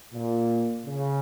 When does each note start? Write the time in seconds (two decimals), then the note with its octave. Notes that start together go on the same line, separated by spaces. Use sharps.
0.13 A#2
0.86 C#3